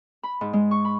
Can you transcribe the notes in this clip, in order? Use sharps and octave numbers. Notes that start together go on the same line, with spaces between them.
B5
G#2
G#3
C#6
B5